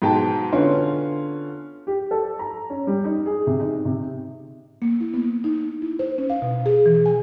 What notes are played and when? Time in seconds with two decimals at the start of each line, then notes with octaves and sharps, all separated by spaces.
0.02 G#2 B2 G#3 G5 A5
0.52 D3 B3 C#4 F4 C6
1.87 G4
2.11 A4
2.39 A#5
2.70 C#4
2.87 G3
3.04 D#4
3.26 G#4
3.47 C3
3.60 D#4
3.85 C3
4.82 A#3
5.00 E4
5.14 B3
5.44 D#4
5.82 E4
5.99 C5
6.18 C#4
6.30 F5
6.42 B2
6.66 G#4
6.86 E3
7.06 G#5